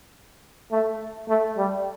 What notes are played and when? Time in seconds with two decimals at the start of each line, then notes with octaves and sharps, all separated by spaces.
0.71 A3
1.28 A3
1.57 G3